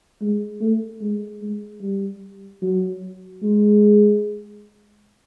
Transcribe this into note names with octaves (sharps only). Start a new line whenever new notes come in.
G#3
A3
G#3
G#3
G3
F#3
G#3